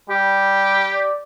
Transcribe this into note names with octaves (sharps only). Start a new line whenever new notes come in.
G3 G4
D5